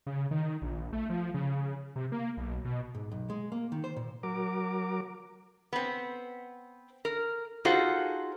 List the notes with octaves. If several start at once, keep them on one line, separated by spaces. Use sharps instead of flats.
C#3
D#3
A#1
A3
F3
C#3
C3
A#3
B1
B2
G#2
B1
G#3
A#3
D#3
C5
A#2
F#3 A#4 D6
B3 C4
A#4
D#4 F4 F#4 G#4 A4 C5